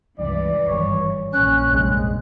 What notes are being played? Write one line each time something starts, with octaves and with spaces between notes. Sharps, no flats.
C#2 G2 E3 D5
G#1 G2 G3 C#5
A#1 C#4 F#6
C2 F2 G#2 G#3